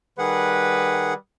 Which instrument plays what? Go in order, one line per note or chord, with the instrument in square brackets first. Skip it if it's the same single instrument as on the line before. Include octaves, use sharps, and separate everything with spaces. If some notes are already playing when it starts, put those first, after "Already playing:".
[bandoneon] D#3 G#4 F#5 [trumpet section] G3 B4